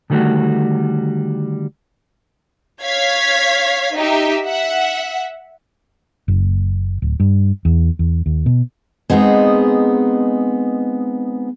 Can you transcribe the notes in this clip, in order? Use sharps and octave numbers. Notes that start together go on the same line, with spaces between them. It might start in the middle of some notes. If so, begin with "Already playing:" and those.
D3 D#3 G3 A3 F#4
C#5 F5 G#6 B6
D#4 G4 E5
E5 F#5
F#1
D1
G2
E2
E2
D#2
B2
G#3 B3 C4 D#4 G#4